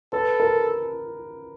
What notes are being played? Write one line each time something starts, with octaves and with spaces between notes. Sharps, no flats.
A4 B4
A#4